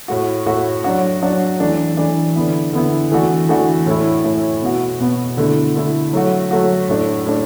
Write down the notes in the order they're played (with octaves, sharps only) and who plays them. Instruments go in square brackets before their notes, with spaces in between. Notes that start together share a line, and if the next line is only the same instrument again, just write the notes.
[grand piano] A2 A3 F#4
A2 A3 F#4
F#3 D4 F#4
F#3 D4 F#4
E3 A3 D4
E3 A3 D4
D3 B3 E4
D3 B3 E4
E3 A3 D4 F#4
E3 A3 D4 F#4
A2 A3 E4
A2 A3 E4
B2 B3 F#4
B2 B3 F#4
D3 A3 E4
D3 A3 E4
F#3 A3 F#4
F#3 A3 F#4
A2 A3 D4
A2 A3 D4